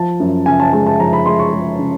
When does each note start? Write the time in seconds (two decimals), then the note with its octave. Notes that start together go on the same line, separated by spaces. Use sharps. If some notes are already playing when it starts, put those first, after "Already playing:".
Already playing: F3 A5
0.20 F#2
0.46 C#3 G#5
0.60 A5
0.73 G#3 A5
0.86 A5
0.99 F3 A#5
1.13 B5
1.26 G#3 C6
1.39 C#6
1.52 G#3
1.79 C#3